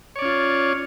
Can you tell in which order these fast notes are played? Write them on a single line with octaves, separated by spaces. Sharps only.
C#5 D5 C#4 F4